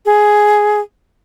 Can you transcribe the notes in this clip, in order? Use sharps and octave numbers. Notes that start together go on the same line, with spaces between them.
G#4